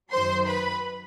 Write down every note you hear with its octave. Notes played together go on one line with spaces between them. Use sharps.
F#2 D#3 F#3 C5 C6
B4 B5